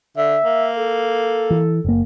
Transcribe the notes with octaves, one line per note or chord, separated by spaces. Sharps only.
D3 E5
A#3
A4
E3
F#1 A#3